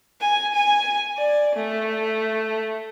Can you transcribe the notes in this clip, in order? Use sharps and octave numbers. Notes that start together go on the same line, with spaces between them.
G#5
G#5
D5
A3